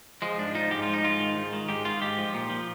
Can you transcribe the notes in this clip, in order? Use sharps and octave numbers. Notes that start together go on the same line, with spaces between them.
F3 G#3
G#2 D4
F3 D#4
G#2 G4
F3 F4
D#4
G#2 F4
D#3
G#2
D#3
G#2 G4
D#3 F4
G#2 G4
F3
A#2
F3